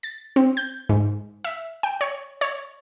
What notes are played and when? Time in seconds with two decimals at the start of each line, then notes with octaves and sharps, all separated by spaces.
0.03 A6
0.36 C4
0.57 G6
0.89 G#2
1.44 E5
1.83 G5
2.01 C#5
2.41 C#5